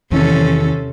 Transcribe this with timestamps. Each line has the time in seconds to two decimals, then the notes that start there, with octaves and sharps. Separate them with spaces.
0.12 E2 C3 D#3 E3 C#4 A4